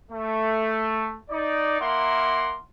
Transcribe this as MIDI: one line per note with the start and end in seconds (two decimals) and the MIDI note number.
0.10 1.16 57
1.30 1.79 63
1.30 1.79 74
1.80 2.56 58
1.80 2.56 64
1.80 2.56 70
1.80 2.56 78
1.80 2.56 84
1.80 2.56 86